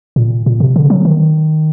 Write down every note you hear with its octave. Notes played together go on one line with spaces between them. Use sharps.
A#2
A#2
C3
D3
F#3
D#3